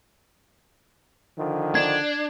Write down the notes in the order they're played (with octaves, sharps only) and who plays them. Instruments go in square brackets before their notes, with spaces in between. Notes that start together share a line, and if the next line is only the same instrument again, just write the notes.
[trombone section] D3 D#3 F3
[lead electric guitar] D4 [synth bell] G#6